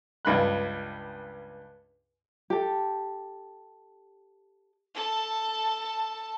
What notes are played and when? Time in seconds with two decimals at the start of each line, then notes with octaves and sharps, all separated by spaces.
0.25 C#2 G2 B5 F#6
2.50 G4 A4
4.94 A4 A5